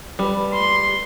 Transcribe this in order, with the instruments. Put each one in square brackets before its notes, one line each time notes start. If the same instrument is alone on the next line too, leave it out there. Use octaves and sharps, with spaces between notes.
[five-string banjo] G3 [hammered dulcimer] A4 B4
[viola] C6